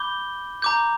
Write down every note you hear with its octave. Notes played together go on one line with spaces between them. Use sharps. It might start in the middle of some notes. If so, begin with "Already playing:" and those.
Already playing: B5 D6 G6 G7
A#5 D6 G6